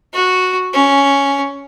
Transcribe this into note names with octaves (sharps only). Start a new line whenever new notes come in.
F#4
C#4